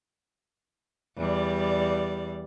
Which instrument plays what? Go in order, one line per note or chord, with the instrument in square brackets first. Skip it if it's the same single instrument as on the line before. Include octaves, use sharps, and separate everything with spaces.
[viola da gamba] E2 G3 D5